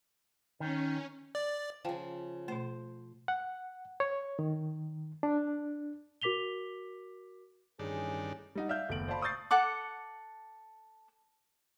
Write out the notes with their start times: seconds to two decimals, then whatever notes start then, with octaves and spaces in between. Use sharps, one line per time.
0.60 D#3 C#4
1.35 D5
1.85 C#3 F3 F5 G5 A5
2.48 B2 A3 C5
3.28 F#5
4.00 C#5
4.39 D#3
5.23 D4
6.22 F#4 A#4 D6 B6 F7 G7
7.79 A1 G2 D#3 C#4 D4 G#4
8.55 G3 D#4 F#5
8.69 D5 E5 F5 F6 G6
8.89 F#1 D#2 A3 B3 D7 F#7
9.08 C5 D5 F5 A5 B5 C6
9.22 C#6 D#6 E6 G6 A6 C7
9.51 A4 F#5 D6